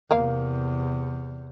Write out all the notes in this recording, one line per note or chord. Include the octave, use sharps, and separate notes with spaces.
E2 C3 A#3 A#4 F5